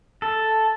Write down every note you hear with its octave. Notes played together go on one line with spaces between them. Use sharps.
A4